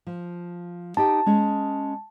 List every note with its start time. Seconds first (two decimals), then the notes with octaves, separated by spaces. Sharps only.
0.07 F3
0.97 D#4 G4 G5 A5
1.26 G#3 C#4 G#4